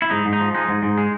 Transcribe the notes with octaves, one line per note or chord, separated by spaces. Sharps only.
E4
G#2 D#4
G#2
D#4
F3
G#3 D#4
G#2
G#2
G#3